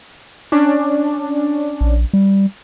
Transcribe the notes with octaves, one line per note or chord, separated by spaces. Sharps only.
C#4 D4
A#1
G3